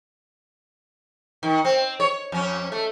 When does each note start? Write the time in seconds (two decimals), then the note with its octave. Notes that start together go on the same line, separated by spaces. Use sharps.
1.43 D#3
1.65 C4
2.00 C#5
2.32 F2 C#4
2.72 A3